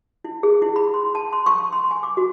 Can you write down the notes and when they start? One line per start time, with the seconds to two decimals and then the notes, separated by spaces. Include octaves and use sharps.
0.24 E4
0.43 G#4
0.62 E4
0.76 B5
0.94 C6
1.15 A5
1.33 C6
1.46 C#6
1.73 C6
1.91 G#5
2.03 D6
2.17 F#4